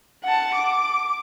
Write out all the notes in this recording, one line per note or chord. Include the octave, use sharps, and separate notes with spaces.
F#5 A5
D6